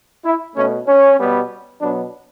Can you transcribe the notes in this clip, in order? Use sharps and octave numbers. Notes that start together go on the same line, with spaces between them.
E4
B2 A3 C#4
C#4
B2 G3 B3
B2 F#3 B3 D4